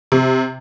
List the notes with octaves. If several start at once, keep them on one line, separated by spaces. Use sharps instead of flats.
C3